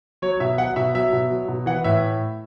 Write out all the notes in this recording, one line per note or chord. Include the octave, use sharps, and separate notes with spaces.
F#3 C#5
B2 E5
F#3 F#5
B2 E5
F#3 E5
B2
F#3
B2
E3 F#5
A2 E5